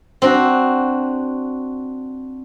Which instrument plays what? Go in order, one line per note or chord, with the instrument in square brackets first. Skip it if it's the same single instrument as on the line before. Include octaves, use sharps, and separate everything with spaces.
[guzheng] C4 D4 F#4